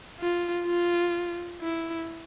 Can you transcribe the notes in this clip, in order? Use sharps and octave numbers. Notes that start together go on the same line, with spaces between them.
F4
F4
E4